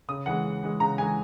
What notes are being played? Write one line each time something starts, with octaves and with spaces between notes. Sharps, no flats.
C#3 D#6
E3 G#3 F#5
C#3
E3 G#3
C#3 A#5
E3 G#3 G#5